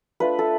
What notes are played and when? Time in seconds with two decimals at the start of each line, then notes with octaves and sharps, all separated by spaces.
0.20 A3 D4 F4 B4
0.39 A4